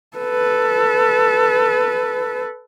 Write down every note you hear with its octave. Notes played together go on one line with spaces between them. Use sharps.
A4 B4